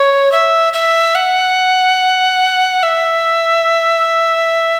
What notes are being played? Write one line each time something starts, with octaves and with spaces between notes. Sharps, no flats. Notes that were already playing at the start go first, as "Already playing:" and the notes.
Already playing: C#5
E5
E5
F#5
E5